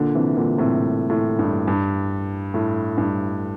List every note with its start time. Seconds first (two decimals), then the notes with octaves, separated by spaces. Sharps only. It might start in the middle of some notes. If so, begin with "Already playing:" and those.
Already playing: A#2 D3
0.15 C3 E3
0.37 A#2 D3
0.58 A2 C3
1.10 A2
1.39 G2
1.67 G2
2.54 A2
2.98 G2